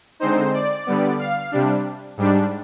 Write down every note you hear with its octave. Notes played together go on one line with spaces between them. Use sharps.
D3 G#3 C4 D#4 C5
D5
D3 G3 B3
F5
C3 G3 D4
G#2 G3 D4